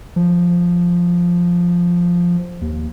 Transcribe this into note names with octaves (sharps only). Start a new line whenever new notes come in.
F3
D#2